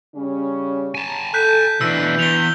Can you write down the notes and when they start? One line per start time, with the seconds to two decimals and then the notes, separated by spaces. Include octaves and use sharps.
0.16 C#3 G3 C#4
0.95 G#5 A5
1.34 A4 F#6 G6 B6
1.81 B2 E3 D4 E6
2.19 E2 F7 G7